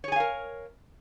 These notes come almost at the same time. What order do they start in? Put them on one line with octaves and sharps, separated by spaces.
C#5 G#4 G#5 F5 A#4